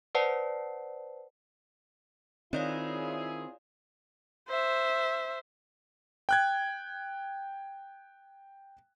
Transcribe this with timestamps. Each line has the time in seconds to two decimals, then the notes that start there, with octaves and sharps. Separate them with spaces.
0.15 B4 C5 D5 F#5 A5 C7
2.53 D#3 C4 E4 F4 G#4 C#5 D5 F5
4.48 C5 E5
6.29 G5 F#6 G#6